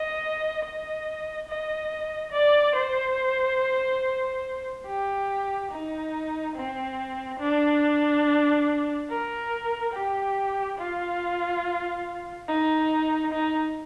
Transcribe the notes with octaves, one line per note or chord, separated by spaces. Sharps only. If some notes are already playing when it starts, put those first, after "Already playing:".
Already playing: D#5
D#5
D#5
D5
C5
G4
D#4
C4
D4
A#4
G4
F4
D#4
D#4